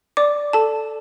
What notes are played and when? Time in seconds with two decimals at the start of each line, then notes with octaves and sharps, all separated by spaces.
0.17 D5 D6
0.53 A4 A5